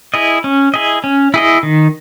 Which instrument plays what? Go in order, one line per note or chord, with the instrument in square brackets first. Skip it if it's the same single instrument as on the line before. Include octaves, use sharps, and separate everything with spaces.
[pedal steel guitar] E4 G#4 D#5
C#4
E4 G#4 D#5
C#4
E4 G#4 D#5
D#3